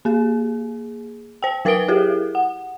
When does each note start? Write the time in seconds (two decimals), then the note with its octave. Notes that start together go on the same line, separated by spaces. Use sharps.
0.05 A#3 G#4
1.43 C5 G5
1.65 F#3 A#4 B4 D#6 D7 G7
1.88 E4 G4 G#4 A#4
2.35 F#5